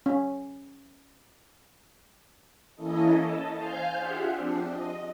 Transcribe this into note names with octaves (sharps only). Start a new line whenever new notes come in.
C#4
E3 A#3 C#4 E4 A4 D#5
A5
C5 F5 G#5 F6 G6
D4 F4 G4 G#4 E5 F#5
F3 C4 D4
D#5